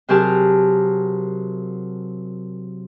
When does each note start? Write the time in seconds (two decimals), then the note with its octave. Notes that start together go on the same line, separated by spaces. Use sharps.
0.09 C3 F#3 G4 G#4 A#4 A5